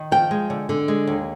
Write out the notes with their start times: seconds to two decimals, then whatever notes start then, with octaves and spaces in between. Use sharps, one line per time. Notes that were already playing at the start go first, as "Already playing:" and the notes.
Already playing: D#3
0.11 F3 G5
0.31 G#3
0.50 D3
0.69 D3
0.88 G#3
1.07 D#2